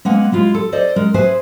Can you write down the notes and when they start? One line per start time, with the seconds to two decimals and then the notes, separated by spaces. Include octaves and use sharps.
0.05 G#3 A#3 B3 F#5 G#5
0.32 G#3 E4 F4
0.54 A4
0.72 A4 C5 D5 D#5
0.96 G#3 A#4
1.14 G#4 B4 C5 E5 G#5